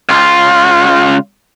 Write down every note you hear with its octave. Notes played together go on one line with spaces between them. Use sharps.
C#2 F4